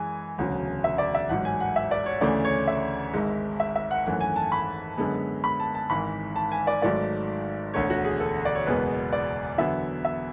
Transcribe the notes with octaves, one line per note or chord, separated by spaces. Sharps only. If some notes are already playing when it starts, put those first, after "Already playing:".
Already playing: F#2 E3 G#3 G#5
E1 D2 C#3 F#3
E5
D5
E5
A1 G#2 F#3 F#5
G#5
F#5
E5
D5
C#5
D2 C#3 E3 A3 D5
C#5
E5
G#1 G#2 G#3
E5
E5
F#5
G#1 F#2 E3 A3 F#5
G#5
A5
B5
F#2 D3 G#3 B3
B5
A5
A5
G#1 G#2 E3 B5
A5
G#5
D5
G#1 G#2 F#3 A3 D5
E1 D2 D3 A3 C#5
F#4
G#4
A4
D5
C#5
F#1 E2 B2 G#3 B3 B4
D5
E2 D3 F#3 B3 E5
E5